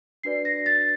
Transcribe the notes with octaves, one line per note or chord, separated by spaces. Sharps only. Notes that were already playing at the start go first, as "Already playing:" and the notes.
D4 F#4 B4 D5 C7
A#6
A6